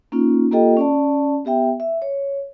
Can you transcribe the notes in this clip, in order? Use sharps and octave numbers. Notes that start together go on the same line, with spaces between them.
A#3 C#4 D#4 F4
A#3 F4 G4 A4 D#5 G5
C#4 D5 A5
B3 G4 E5 G5
E5
C#5